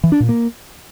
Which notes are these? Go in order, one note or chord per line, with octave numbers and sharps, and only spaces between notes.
E3
D4
A#2
A#3